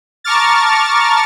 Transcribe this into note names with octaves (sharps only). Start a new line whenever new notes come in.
A5 A#5 C#6 D6 F6 A6